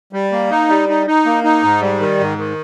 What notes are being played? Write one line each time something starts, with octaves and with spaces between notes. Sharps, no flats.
G3
A#3
D#4
G3
D#4
D#4
A#3
D#4
G#2
G3
D#3
G#2
D#3